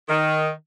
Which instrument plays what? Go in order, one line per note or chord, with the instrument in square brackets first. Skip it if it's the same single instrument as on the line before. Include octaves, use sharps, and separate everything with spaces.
[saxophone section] D#3